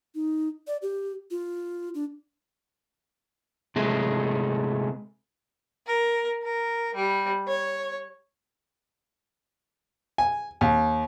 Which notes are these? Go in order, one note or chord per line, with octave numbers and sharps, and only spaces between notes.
D#4
D5
G4
F4
D4
C3 G#3 A3
A#4
A#4
G3
C#5
G#5
D#2